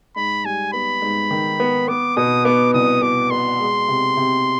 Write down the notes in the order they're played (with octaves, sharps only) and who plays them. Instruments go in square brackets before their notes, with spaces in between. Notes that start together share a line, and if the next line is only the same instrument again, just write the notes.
[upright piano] G#2 [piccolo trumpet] B5
[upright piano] G3 [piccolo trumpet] G#5
[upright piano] B3 [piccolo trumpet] B5
[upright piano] G#2
D#3
B3
[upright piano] B3 [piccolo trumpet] D6
[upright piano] B2 [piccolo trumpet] D#6
[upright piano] B3 [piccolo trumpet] D6
[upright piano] C2 [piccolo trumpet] D#6
[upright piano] B2 [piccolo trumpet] D6
[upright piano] B2 [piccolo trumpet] C6
[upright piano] G#3
C3
C3